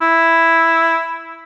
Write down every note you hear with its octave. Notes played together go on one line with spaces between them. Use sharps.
E4